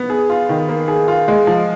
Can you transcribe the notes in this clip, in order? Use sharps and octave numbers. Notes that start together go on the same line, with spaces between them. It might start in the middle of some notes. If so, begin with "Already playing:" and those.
Already playing: B3
G#4
F4
D#3
A#3
G#4
F4
G#3
F3